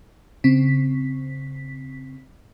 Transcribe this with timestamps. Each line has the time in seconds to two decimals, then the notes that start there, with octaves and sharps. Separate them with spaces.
0.44 C#3 C4 B6